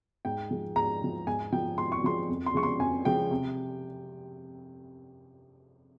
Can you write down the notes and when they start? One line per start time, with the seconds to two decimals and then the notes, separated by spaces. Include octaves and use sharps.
0.25 G#2 G5
0.51 F3 G#3
0.76 G#2 A#5
1.02 F3 G#3
1.27 G#2 G#5
1.52 F3 G#3 G5
1.78 G#2 C6
1.92 C#6
2.04 F3 G#3 C6
2.29 F2
2.46 C6
2.54 C#3 F3 G#3 C#6
2.63 C6
2.79 F2 G#5
3.05 C#3 F3 G#3 G5
3.31 C3